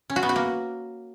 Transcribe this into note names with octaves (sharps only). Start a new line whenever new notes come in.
C#4
F#4
B3
F#4
A#3